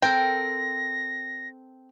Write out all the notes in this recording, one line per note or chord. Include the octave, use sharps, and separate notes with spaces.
C4 A4 A#4 G5 A#6